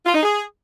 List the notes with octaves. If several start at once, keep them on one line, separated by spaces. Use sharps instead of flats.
F4
D#4
G#4